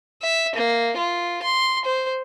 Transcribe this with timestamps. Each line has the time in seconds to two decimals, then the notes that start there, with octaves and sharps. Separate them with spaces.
0.22 E5
0.55 A#3
0.97 F4
1.43 C6
1.85 C5